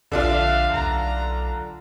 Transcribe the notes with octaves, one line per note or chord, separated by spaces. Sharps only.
A#1 D3 D4 F4 E5 F5
B1 A#5